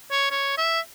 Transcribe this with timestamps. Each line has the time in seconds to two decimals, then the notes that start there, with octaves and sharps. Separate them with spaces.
0.11 C#5
0.31 C#5
0.58 E5